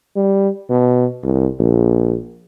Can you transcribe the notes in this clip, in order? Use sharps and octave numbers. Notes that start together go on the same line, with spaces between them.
G3
B2
C2
A#1